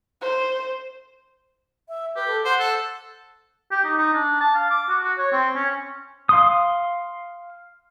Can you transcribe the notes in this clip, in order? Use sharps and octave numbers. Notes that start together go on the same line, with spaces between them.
C5
E5
G4 B4
A4
C5 F#5
A4
G4
D#4
D#4
D4
A5
F5
D6
F#4
F#4
C#5
C4
C#4
F5 C6 D#6